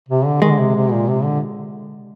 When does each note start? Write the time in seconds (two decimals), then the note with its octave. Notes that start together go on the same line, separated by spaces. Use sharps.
0.09 C3
0.25 D3
0.42 D#3 G#3
0.51 D3
0.58 C3
0.75 C3
0.91 A#2
1.08 C3
1.24 D3